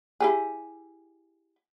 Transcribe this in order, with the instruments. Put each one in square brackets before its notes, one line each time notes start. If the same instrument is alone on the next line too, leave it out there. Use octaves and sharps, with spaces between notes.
[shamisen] E4 G4 G#4